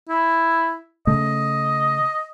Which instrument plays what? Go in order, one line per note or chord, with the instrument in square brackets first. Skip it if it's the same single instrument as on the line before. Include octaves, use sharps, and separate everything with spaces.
[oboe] E4
[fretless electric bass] C#3 A3 [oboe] D#5